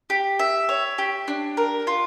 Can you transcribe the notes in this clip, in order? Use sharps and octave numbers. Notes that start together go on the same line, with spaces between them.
G4
E5
C#5
G4
D4
A#4
F4